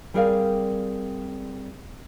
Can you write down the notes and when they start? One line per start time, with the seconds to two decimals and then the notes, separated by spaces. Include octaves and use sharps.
0.14 G3 C4 G#4 A#4 D5 F5